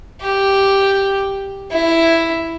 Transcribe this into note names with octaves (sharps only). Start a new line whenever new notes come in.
G4
E4